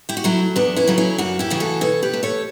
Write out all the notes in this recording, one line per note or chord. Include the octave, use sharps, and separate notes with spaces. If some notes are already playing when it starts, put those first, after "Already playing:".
E4 G4
F#4
F#3 A3 C#4 E4
E2 B3 D4
C#4 E4
C#3 F#3 A3
C#4 E4
F#2 D4 F#4
E4 G4
C#3 E3 A3
F#4 A4
B2 A4 C#5
G4 B4
A3
A4 C#5